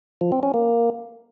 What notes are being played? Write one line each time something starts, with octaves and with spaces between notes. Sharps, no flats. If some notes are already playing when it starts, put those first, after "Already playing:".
F3
C4
C#4
A#3